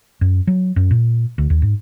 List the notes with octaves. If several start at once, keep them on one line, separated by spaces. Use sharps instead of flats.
F#2
F#3
F#2
A#2
D2
D#2
G#2